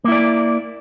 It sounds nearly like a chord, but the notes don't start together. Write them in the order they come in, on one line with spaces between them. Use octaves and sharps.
A#3 E4 D5